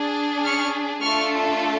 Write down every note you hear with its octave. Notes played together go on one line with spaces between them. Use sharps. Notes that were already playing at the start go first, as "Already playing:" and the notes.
Already playing: D4 G#4
C#6 F6
A3 D4 F4 A4 C#6 F6